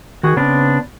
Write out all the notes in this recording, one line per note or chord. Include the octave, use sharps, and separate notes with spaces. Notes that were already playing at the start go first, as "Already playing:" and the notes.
D#3 F#4 G#4
C#3 B3 C4 D4